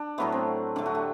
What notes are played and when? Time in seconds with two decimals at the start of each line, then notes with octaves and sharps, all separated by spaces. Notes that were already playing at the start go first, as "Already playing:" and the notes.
Already playing: D4
0.18 A2 F#3 A3 B3
0.32 C4
0.76 D3 A3 D4
0.86 F#4
0.95 G4